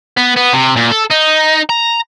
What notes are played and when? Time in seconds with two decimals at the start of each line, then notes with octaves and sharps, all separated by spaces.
0.17 B3
0.37 B3
0.54 C3
0.77 A#2
0.92 A4
1.11 D#4
1.69 A#5